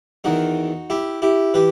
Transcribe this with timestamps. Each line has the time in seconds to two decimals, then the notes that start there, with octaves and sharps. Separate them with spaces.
0.24 E2 D#3 D#4 F#4
0.90 E4 G4
1.22 E4 G4
1.54 E3 G4 B4